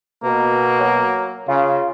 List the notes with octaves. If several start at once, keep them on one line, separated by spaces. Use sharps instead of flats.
B2 A#3
F#3
C#3 F4